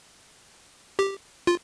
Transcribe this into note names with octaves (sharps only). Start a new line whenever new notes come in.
G4
F4